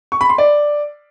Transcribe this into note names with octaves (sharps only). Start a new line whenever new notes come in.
C#6
B5
C6
D5